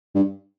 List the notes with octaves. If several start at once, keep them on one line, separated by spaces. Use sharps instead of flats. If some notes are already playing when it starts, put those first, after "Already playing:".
G2